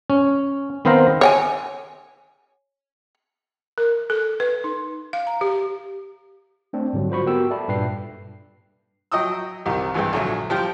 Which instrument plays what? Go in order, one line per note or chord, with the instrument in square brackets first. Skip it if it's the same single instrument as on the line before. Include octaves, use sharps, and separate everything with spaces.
[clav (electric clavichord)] C#4
D#3 B3 C4 C5 F5 A#5
[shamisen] C#5 G5 G#5
[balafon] A#4
A4
B4
D#4
F5
A#5
G4
[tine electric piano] A3 C4 D4
G#2 D3 F#3 G3
F4 F#4 C5 B5 C#6
B3 F#4 G4 A#4 G5 E6
A4 D5 E5 A5 B5
G2 A#2 B4 G5 C7
[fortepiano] F#3 D#5 G5 C#6 D#6 E6
C2 D#3 G4
G#1 G2 E3 G#3 G5
A#1 D3 F#3 G#4 E5 G#5
F3 G3 F4 G5 A5